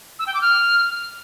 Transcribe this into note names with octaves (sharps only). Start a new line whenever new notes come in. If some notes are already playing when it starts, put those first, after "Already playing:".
E6
G5
D6
F6